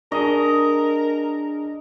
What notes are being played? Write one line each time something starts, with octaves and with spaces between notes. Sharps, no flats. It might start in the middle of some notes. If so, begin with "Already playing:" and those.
D4 G#4 A#4 D#5